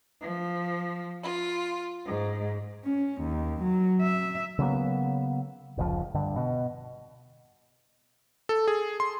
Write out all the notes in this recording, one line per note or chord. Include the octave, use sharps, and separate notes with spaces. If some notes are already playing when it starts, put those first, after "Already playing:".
F3
F4
G#2
C#4
D#2
F#3
E5
C#3 F#3 A#3 B3
F1 C#2 F3
G2 D3
B2
A4
G#4
C6